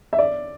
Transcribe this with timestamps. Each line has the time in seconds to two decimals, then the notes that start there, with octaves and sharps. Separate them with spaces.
0.13 E5
0.18 D5